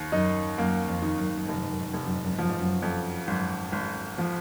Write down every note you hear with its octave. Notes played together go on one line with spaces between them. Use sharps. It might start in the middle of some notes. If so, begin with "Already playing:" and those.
Already playing: D#2
F#2 D#4
F#2 A#3
F2
D#3
F#2
G#2
F#2
G#2
F1 F#2
G#2
F#2
G#2
F#2
F1 G#2
F#2
G#2
F#2
G#2
F#2 F3
G#2
F#2
F2
G#1 F#2
G#1
F3